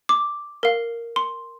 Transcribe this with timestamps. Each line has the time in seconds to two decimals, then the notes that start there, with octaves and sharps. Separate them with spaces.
0.09 D6
0.63 A#4 F5
1.16 C6